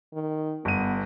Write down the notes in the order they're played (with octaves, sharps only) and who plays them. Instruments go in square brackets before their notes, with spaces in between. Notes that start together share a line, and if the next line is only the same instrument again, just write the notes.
[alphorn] D#3
[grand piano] G1 D#7 [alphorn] B3